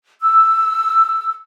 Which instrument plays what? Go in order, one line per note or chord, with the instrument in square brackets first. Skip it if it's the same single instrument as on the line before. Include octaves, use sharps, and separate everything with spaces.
[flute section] E6